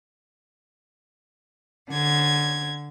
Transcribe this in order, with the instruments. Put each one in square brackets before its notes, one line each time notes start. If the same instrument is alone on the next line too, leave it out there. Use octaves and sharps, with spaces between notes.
[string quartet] D3 G#6